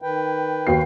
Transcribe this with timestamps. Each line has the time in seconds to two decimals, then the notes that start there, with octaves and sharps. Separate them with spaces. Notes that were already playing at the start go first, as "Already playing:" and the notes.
0.02 D#3 B4 G5
0.67 D#2 F#4 C7